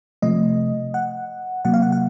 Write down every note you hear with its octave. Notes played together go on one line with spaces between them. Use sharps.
C3 F3 A3 D#5
F#5
C3 F#3 A#3 F#5
F5
F#5
F#5